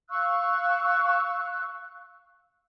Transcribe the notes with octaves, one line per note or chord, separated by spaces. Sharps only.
F5 C#6 E6 F#6